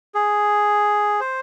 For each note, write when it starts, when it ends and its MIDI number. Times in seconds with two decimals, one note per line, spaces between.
0.15 1.20 68
1.20 1.40 72